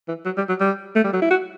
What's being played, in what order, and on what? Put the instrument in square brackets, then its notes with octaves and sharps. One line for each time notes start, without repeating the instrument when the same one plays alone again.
[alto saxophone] E3
F#3
G3
F#3
G3
A3
G3
F#3
E4
F#4